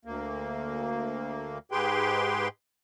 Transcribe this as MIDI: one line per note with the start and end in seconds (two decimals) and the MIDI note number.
0.05 1.58 38
0.05 1.58 58
1.71 2.48 44
1.71 2.48 67
1.71 2.48 68
1.71 2.48 71
1.71 2.48 79
1.71 2.48 84